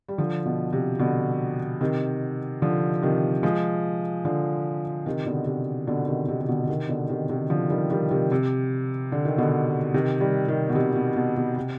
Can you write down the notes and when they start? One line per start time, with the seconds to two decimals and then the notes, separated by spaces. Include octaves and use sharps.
0.08 G3
0.18 D3 F3
0.45 B2
0.73 C3
0.99 B2 D3
1.81 C3 D#3
2.62 D3 F3
3.03 C3 D#3
3.43 F3 G#3
4.25 D3 F3
5.06 C3 D#3
5.26 B2 D3
5.47 C3
5.87 B2 D3
6.07 C3 D#3
6.28 C3 D#3
6.41 C3
6.48 B2 D3
6.64 D3
6.69 C3 D#3
6.89 B2 D3
7.09 C3 D#3
7.29 C3 D#3
7.50 D3 F3
7.70 D#3 G3
7.91 D#3 G3
8.11 C3 D#3
8.32 C3
9.12 D3
9.25 D#3
9.38 B2 D3
9.94 C3 D#3
10.21 D#3 G3
10.48 C3 D#3
10.69 B2
10.75 C3
10.95 B2
11.16 B2
11.36 B2
11.57 C3